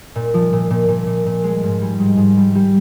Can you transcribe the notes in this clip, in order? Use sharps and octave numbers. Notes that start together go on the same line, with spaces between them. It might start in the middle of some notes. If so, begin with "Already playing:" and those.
A#2
F3
A#2
A#2
A#2
A#2
A#2
G#3
G#2
G3
G#2
G#2
G3
G3